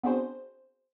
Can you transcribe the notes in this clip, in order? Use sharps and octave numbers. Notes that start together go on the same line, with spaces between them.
B3 C4 D4 F#4 G#4 C5